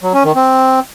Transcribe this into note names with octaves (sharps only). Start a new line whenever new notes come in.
F#3
C#4
D#3
C4